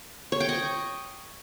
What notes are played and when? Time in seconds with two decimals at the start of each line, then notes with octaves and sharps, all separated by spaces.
0.32 C#5
0.40 G5
0.49 D#5